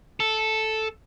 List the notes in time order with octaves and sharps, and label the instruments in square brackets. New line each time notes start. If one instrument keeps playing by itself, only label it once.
[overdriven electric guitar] A4